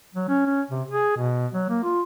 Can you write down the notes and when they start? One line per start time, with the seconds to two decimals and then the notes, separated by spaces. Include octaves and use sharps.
0.15 F#3
0.29 C#4
0.46 C#4
0.71 C3
0.90 G#4
1.17 B2
1.53 F#3
1.69 A#3
1.84 F4